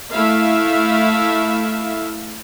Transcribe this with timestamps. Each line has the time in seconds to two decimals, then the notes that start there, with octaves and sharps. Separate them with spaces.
0.12 A3 E4 E5 F5